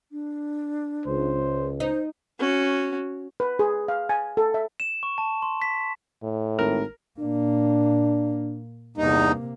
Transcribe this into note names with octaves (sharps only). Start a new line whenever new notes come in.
D4
C#2 C5
D#4 C5
C#4 F#4
B4
G#4
F5
G#5
A4
E5
E7
C#6
A5
C6
B6
A2
G#1 A#4
A#2 A#3 D4
E2 G2 C3 A#3 D#4